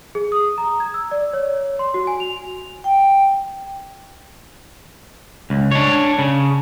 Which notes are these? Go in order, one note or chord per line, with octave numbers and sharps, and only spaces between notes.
G#4
D#6
A#5
G#6
E6
D5
C#5
C6
F#4
G#5
F7
G5
C#2
D4 C#5
C#3